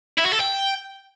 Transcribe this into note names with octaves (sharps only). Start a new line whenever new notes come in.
E4
F#4
A4
G5